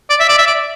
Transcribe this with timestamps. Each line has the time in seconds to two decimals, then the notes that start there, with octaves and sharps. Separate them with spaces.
0.10 D5
0.20 E5
0.29 D5
0.38 E5
0.47 D5